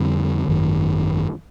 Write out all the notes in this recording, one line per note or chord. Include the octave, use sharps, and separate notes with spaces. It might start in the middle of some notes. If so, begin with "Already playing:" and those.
Already playing: F2 D3 G3 C4
G#1 F#2 D#3 F#3